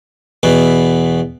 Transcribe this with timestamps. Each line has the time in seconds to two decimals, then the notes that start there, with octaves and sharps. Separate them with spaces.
0.43 E2 B2 B3